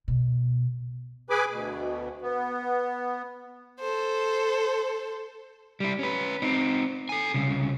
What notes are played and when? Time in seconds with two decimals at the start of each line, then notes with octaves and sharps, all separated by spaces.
0.08 B2
1.30 G#4 B4 G#5 B5 D6
1.50 D2 B2
2.22 B3
3.80 A4 C5
5.80 G3 E4
5.99 C#4 B4
6.42 C4 D#4
7.09 A4 G#5
7.34 C2 C#3